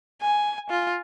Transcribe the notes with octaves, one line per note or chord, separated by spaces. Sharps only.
G#5
F4